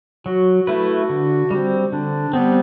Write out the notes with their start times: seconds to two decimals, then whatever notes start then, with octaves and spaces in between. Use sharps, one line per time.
0.26 F#3 F#4
0.67 A3 E4 B4
1.09 D3
1.51 G3 C4
1.92 D3 D4
2.33 G3 B3 C4